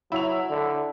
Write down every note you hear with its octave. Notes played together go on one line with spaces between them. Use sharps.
F#3 E4 F7
D3